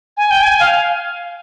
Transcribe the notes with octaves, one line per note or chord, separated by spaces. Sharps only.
G#5
G5
G#5
F5